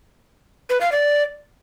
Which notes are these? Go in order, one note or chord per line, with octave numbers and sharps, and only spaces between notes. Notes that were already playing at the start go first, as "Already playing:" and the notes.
B4
F5
D5